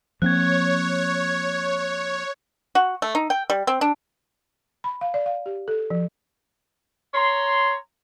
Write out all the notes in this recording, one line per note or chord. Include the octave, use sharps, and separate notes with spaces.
F3 A#3 C4 C#5 F#6 G#6
F#4
A3
D#4
G5
G3
C4
D4
B5
F5
D5
F5
G4
A4
F3
C#5 A#5 C6